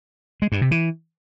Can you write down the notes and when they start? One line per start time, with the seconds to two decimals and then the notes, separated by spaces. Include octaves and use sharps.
0.42 G#3
0.52 G2
0.62 C3
0.71 E3